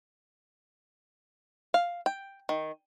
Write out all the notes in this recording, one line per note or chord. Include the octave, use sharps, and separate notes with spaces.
F5
G5
D#3